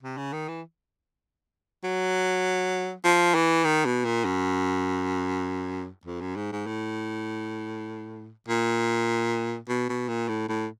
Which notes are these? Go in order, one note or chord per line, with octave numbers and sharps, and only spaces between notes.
C3
C#3
D#3
E3
F#3
F3
E3
D#3
B2
A#2
F#2
F2
F#2
G#2
G#2
A2
A#2
B2
B2
A#2
A2
A2